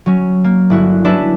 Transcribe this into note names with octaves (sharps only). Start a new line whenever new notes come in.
F#3 C#4
A#3
G1 E4 F#4
F#3 C#4 D4 E4 B4 E5